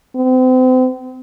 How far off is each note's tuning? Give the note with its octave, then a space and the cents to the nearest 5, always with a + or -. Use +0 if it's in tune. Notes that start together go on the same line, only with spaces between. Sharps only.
C4 -35